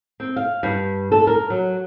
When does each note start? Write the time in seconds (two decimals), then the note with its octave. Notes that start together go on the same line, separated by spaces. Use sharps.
0.20 C4
0.36 F5
0.63 G2
1.12 A4
1.27 A#4
1.50 F#3